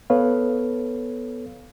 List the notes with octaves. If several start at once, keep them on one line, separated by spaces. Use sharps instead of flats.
B3 A4 B4 C#5 F5